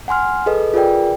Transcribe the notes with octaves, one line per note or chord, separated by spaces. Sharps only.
F#5 G#5 C6 F6
G#4 A4 B4 D#5
F4 G#4 A#4 B4 D5 G5